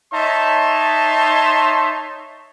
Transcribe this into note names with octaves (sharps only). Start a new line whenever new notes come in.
D#4 C#5 E5 A5 C6